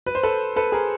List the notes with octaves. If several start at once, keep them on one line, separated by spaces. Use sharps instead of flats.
B4
C5
A4 B4
A4 B4
G#4 A#4